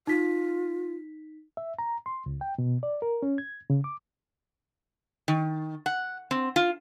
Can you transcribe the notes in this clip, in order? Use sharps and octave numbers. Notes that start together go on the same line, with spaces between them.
D#4 F4 B6
E5
A#5
C6
C#2
G5
B2
D5
A#4
C#4
G#6
C#3
D6
D#3
F#5
C4
F4